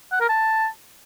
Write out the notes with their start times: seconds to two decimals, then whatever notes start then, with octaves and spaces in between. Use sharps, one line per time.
0.12 F#5
0.20 A#4
0.29 A5